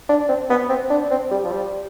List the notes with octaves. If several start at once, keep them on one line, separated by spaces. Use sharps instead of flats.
D4
C4
B3
C4
D4
C4
G3
F3
G3